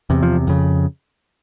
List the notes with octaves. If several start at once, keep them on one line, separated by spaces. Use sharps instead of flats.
E2 C3
F3
F2 C#3